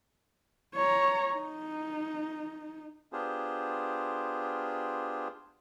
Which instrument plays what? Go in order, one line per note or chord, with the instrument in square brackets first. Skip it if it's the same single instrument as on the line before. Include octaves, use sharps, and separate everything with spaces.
[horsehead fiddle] C#5 A#5
D#4
[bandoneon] B3 D4 F4 G4 G#4 C5